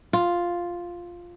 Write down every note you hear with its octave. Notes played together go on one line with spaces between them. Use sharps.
F4